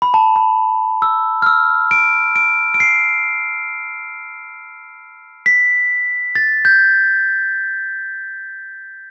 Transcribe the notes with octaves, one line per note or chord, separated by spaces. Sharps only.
B5
A5
B5
E6
F6
E6
D7
D7
D7
C7
B6
A6
G6